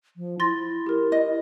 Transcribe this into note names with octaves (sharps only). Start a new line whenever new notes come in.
F3
E4 C6 A6 A#6
G4 A#4
D#5